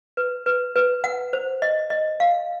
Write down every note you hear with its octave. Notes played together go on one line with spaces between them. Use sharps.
B4
B4
B4
F#5
C5
D#5
D#5
F5